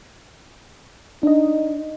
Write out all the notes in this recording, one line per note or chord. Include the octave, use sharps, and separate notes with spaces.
D4 D#4 D#5